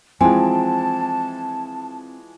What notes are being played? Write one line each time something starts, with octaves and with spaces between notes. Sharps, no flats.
E3 F3 G#3 C4 G#5 A5